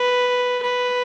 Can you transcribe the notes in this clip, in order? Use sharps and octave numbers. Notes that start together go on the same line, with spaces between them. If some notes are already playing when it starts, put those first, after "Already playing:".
Already playing: B4
B4